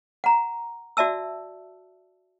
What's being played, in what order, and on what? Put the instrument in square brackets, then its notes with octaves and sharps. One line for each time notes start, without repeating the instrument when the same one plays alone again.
[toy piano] F#5 A#5
F#4 D5 E5 A5 E6